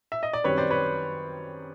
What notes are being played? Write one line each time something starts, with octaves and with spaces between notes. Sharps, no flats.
E5
D#5
D5
F#2 D#3 G3 C4 B4 C#5
C5 D5
B4 C#5